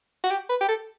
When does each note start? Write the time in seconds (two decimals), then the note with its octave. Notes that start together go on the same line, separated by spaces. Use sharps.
0.23 F#4
0.30 G4
0.49 B4
0.61 G4
0.68 A4